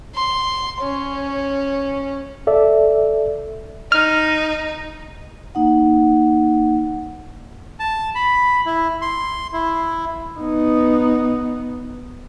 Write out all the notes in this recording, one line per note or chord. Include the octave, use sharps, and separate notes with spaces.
C6
C#4
A4 D5 E5
D#4 F6
A#3 D#4 F#5
A5
B5
E4
C6
E4
B3 D#4